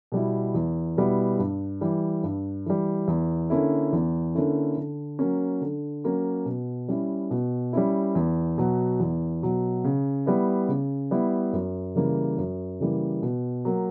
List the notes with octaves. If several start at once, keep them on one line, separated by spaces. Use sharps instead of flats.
B2 G3 B3 E4
E2
B2 G3 B3 E4
G2
E3 G3
G2
E3 G3
E2
D3 A#3 C#4 E4
E2
D3 A#3 C#4 E4
D3
F#3 A#3 C#4
D3
F#3 A#3 C#4
B2
G3 C#4 E4
B2
G3 C#4 E4
E2
B2 F#3
E2
B2 F#3
C#3
G3 B3 E4
C#3
G3 B3 E4
F#2
C#3 E3 G3 A#3
F#2
C#3 E3 G3 A#3
B2
F#3 A#3